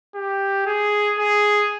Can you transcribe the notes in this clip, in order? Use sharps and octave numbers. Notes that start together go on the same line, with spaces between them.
G4
G#4
G#4